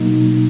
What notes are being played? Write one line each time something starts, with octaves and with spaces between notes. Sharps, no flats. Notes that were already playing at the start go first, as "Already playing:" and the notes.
Already playing: B2 F#3 A#3 D#4